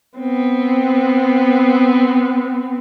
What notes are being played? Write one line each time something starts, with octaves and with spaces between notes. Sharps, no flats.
B3 C4